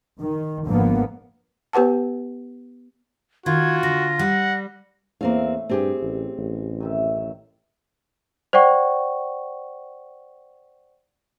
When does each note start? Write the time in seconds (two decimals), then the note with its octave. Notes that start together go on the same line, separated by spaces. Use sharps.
0.20 D#3
0.66 G#1 D3 F3 A#3 B3
1.73 B3 G4 B4 F#5 A5
3.46 D#3 F4 F#4 G#6
3.83 D3 A#6
4.19 G3 F#5
5.21 E2 A2 A#3 C4 F5
5.69 G2 C4 G4 G#4
6.02 A1
6.38 A1
6.80 F#2 D#3 E5
8.53 C5 D5 F#5 G5 C#6